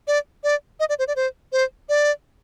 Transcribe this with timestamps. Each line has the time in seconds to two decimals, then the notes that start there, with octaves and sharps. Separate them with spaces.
0.07 D5
0.44 D5
0.80 D#5
0.89 D5
0.99 C5
1.08 D5
1.16 C5
1.52 C5
1.89 D5